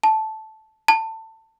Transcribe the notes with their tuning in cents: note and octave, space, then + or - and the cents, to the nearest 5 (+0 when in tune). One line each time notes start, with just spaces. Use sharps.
A5 -10
A5 +20